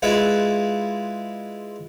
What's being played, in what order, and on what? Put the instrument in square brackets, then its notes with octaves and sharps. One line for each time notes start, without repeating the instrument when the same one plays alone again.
[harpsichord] G#3 E4 F4 B4 F#5